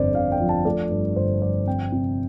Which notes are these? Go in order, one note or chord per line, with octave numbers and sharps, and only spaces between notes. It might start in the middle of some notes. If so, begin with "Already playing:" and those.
Already playing: G1 F2 C5 D5
G1 F5
G5
F3
A5
A3 D5
G2
G1 C5
F3 D5
C4 G5
C3